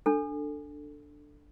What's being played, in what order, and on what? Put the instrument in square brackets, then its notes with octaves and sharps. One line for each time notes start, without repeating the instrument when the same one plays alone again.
[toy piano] D4 A4